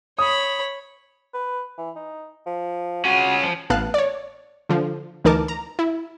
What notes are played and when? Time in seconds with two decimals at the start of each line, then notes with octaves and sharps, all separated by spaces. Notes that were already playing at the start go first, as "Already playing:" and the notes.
0.19 C#5 B5 D#6
1.34 B4
1.78 E3
1.96 D#4
2.46 F3
3.05 C#4 F4 F#4
3.43 F3
3.70 A1 B3 F5 A5 F#6
3.94 C#5 D5
4.69 D3 F3
5.24 D2 E3 D#4 A#4 A5 D6
5.48 A#5
5.79 E4